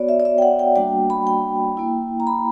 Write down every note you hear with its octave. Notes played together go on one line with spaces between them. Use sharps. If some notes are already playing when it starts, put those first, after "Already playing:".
Already playing: B3 F#4 C#5 D5
E5
D5
E5
G5
F#5
G5
G3 A#3 D4 F#4 G5
B5
G5
A#3 E4
A#5
B5